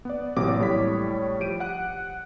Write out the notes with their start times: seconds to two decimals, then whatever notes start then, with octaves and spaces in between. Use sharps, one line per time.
0.05 B3 D5
0.36 A1 C3 F#3 A#3 D6 D#6
0.59 A2 G3 C#5 B6
1.40 F3 G4 D7 D#7
1.60 F#5 F#6